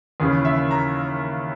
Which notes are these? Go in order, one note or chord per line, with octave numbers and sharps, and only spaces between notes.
D#2 C#3 E3
E5
A#5